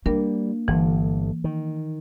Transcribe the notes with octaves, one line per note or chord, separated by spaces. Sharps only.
G3 A#3 D4 A#4
G1 D3 E3
D#3